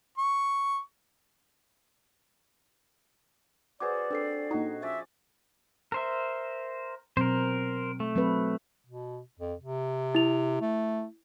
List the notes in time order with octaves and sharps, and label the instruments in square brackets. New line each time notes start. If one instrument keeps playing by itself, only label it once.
[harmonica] C#6
[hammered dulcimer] F#4 G#4 C5 [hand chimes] B4 D6 [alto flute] D5
[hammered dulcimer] C4 [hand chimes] D4 A4 C7
[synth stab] A#2 D#4 [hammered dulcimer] F#4
[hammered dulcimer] F3 C#4 D5 [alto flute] E5
[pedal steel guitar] A#4 C5 E5
[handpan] B2 F#3 C4 [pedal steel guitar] A#4 C5
[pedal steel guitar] A3
[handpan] F#3 C4 B4
[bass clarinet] B2
F2
C3
[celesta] E4 F7
[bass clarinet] A3